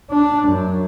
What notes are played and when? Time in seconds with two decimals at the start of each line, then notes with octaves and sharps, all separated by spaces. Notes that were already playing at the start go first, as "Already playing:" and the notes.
0.10 D4
0.48 F#2